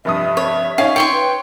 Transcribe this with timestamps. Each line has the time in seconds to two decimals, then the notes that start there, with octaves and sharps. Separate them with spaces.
0.05 F1 G2 E5 D#6
0.37 C#5
0.78 C#4 D#4 C#5 F5
0.96 D#4 C#5 G5 C6 C#6
1.12 B4